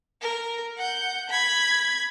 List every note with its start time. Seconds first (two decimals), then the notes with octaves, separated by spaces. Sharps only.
0.21 A#4
0.78 F#5 G6
1.30 B5 G#6